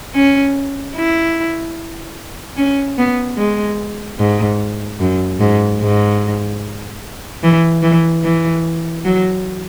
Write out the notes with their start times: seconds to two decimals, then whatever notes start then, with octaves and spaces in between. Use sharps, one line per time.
0.15 C#4
0.95 E4
2.57 C#4
2.98 B3
3.37 G#3
4.18 G#2
5.00 F#2
5.40 G#2
5.81 G#2
7.43 E3
7.83 E3
8.23 E3
9.05 F#3